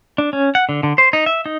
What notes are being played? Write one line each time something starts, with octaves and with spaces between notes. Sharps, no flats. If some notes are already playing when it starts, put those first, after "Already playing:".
D4
C#4
F#5
D3
D3
C5
D#4
E5
D#4